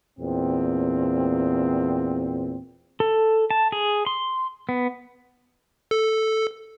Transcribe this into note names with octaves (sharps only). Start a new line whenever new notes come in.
E2 A#2 C4
A4
A5
G#4
C6
B3
A4